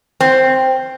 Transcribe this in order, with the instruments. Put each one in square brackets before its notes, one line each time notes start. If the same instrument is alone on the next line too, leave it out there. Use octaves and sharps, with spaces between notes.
[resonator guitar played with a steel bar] C4